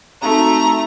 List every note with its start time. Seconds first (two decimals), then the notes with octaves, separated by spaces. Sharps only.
0.22 A3 C4 D#4 F#4 A#5